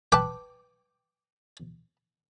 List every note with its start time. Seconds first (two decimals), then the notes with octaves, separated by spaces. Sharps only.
0.12 B4 G5 A5 D6